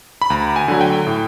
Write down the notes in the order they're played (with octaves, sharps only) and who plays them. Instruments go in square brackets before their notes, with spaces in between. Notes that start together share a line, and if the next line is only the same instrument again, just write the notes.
[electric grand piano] B5
D2 A#5
G#5
D3 F#3
G5
A2